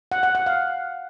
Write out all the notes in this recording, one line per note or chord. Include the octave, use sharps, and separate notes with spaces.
F#5
F#5
F#5
F5